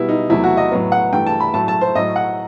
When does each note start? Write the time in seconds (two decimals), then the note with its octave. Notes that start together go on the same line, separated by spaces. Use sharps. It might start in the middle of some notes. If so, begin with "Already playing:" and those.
Already playing: B2 G3 B3 E4
0.09 D#4
0.30 E2 C3 F#3 A3 E4
0.44 F#4
0.57 D#5
0.71 A2 F#3 B3
0.92 F#5
1.13 G2 E3 A3 G5
1.26 A5
1.40 B5
1.54 A2 F#3 A3 A5
1.68 A5
1.81 C5
1.95 A2 F#3 A3 D#5
2.16 F#5